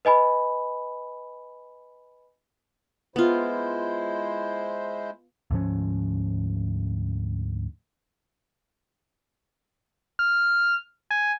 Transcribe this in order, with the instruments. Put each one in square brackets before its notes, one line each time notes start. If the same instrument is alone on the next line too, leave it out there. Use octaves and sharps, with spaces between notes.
[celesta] B4 D#5 G#5 B5
[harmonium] G#3 E4 C5 [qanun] B3 F4
[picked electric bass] D2 G#2 F3 C#4
[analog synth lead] F6
G#5